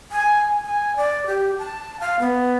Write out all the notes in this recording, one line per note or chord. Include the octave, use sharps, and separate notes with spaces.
G#5
G#5
D5
G4
A5
F5
B3